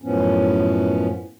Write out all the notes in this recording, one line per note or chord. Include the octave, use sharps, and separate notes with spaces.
F#2 A2 F3 B3 C#4